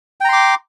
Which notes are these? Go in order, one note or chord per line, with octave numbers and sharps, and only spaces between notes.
G5 A#5 C6 D6